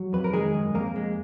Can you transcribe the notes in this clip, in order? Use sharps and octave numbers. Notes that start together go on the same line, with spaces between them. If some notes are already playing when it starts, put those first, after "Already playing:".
Already playing: F#3
F2 B4
A#4
D#3 G#3 G#4
F#2
F2 A#3 A#4
G#3